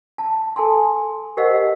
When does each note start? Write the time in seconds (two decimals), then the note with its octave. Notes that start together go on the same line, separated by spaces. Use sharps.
0.18 A5
0.56 A4 G#5 A5 C6
1.37 G4 A#4 C5 D#5 F5 F#5